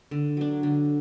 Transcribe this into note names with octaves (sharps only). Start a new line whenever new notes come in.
D3
F#3 D4
D3